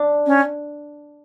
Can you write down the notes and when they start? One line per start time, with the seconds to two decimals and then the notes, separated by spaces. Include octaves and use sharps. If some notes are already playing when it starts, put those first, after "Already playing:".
Already playing: D4
0.27 C#4